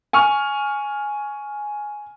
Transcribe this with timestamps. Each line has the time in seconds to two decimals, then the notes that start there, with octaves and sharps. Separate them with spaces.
0.13 G#5 C#6 F6